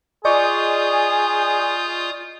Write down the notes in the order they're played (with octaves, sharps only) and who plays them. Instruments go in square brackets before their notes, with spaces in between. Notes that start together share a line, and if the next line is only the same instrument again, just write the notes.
[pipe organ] F4 D#6 G6 [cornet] G#4 [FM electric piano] D5 D#5 C#6